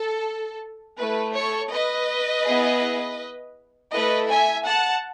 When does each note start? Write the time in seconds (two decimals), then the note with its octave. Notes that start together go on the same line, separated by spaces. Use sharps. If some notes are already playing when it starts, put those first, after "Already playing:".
Already playing: A4
0.98 A3 E4 A4 B4
1.35 A4 C#5
1.72 B4 D#5
2.45 B3 E4 G#4
3.92 A3 E4 A4 B4 D#5
4.29 E5 G#5
4.65 F#5 A5